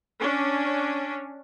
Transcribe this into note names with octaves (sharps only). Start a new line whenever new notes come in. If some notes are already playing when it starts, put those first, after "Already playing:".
C#4 D4